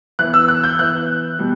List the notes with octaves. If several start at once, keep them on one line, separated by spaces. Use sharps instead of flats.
E3 B3 F#6
E6
F#6
G6
E3 B3 F#6
B2 G3